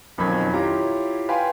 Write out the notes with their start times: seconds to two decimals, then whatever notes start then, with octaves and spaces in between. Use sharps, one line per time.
0.18 B1 F2 D#3 C#4 B5 G#6
0.54 E4 F4 G4 C#5 A#5
1.29 B4 F5 G5 G#5 B5 C6